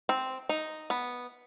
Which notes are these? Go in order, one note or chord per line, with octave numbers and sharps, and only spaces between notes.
C4
D#4
B3